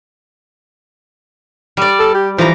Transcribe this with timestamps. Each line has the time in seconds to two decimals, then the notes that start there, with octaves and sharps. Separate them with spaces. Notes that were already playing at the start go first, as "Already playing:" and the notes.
1.77 G3 D5
1.99 A4
2.14 G4
2.38 E3 F3 A#5